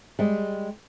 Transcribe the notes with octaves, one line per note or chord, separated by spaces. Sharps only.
G3 G#3